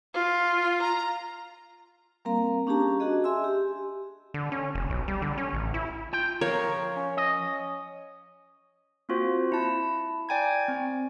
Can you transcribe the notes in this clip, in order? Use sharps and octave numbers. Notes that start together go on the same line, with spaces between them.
F4
A#5
G3 A#3 C4 A#4 F5 A#5
C#4 D4 G4 G#4 A5 A#5
D4 F#4 G#4 D#5
G#4 E5 G#5 C6 E6
G4
D3
C#4
F1
B1
G3
D3
C#4
A1
E4
F4 G5
F3 A#4 C#5 F5 A#5
C#4
C#4 D#5
A#3 C4 F4 F#4 C5
E4 A5
D5 G5 G#5 A#5 G#6
C4